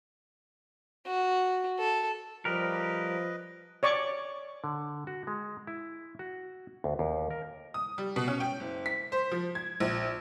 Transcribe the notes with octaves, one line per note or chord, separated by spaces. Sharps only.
F#4
A4
F3 G3 G4 A#4 B4 D#5
C#5 D5 C#6 D6
D3
F#4
G#3
E4
F#4
D2
D#2
A#4
D#6
G3
B2
C#4
G5
F#1
B6
C5
F3
G#6
A#1